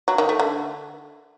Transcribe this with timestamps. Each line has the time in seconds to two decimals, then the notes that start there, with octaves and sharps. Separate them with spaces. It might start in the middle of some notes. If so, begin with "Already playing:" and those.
0.08 F#3
0.18 D#3
0.29 A3
0.39 D3